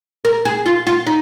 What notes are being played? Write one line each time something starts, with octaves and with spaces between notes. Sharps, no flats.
A#4
G#4
F4
F4
D#4